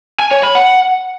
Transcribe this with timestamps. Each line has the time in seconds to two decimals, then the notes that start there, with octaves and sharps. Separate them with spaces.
0.19 G#5
0.31 C#5
0.43 B5
0.55 F#5